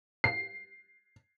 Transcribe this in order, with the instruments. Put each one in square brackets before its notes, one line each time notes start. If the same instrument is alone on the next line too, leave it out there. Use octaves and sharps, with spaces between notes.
[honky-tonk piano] C7